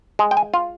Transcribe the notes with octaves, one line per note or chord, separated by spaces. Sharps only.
G#3
G5
G#5
F4